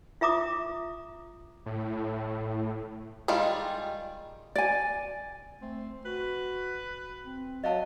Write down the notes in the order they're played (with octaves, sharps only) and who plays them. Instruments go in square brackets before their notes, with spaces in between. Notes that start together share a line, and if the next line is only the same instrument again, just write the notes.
[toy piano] F4 E5 A#5 D6 D#6
[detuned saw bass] A2
[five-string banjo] D#3 G3 G#3 F4
[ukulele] D5 G#5
[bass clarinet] A3 [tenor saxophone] C4
[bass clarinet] F#4 [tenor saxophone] B4
[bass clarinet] C4
[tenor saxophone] F#3 [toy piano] D#5 F5 A5